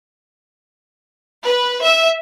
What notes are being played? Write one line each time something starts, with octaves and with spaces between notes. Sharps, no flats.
B4
E5